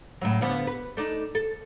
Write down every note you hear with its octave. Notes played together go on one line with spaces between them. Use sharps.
A2 C#3 F#3
D3 F3 B3
B4
A3 D4 D#4
A4